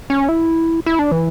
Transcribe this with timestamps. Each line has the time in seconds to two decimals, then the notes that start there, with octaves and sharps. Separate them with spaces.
0.10 C#4
0.29 E4
0.86 E4
0.99 D4
1.12 E3